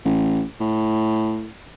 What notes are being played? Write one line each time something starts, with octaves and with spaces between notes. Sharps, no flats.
A1
A2